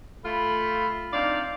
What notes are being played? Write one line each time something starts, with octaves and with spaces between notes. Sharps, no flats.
A3 F4 B5
C4 D4 D#4 D5 F5